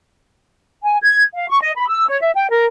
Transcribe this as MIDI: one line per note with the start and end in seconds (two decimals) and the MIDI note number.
0.83 0.97 80
1.03 1.23 92
1.34 1.46 77
1.49 1.61 85
1.61 1.71 75
1.77 1.88 83
1.89 2.07 88
2.08 2.20 73
2.21 2.31 76
2.35 2.49 79
2.50 2.65 70